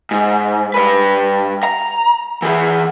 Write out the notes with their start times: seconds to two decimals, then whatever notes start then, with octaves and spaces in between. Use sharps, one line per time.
0.11 G#2
0.74 G2 B4
1.63 A#5
2.42 E3 G#4